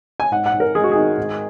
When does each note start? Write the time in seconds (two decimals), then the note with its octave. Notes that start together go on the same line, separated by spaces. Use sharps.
0.20 G#5
0.31 G#2 F#5
0.46 F#5
0.53 G#2
0.60 A#4
0.75 G#3 G#4
0.84 F#4
0.92 D#3 G#4
1.18 G#2